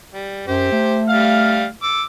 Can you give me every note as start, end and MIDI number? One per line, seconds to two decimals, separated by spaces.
0.13 0.44 55
0.47 0.69 42
0.47 1.01 67
0.47 1.01 72
0.72 1.72 57
1.09 1.65 55
1.09 1.65 77
1.09 1.65 89
1.83 2.03 86
1.83 2.03 88